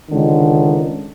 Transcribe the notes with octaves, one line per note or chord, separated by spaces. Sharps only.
C#2 D3 D#3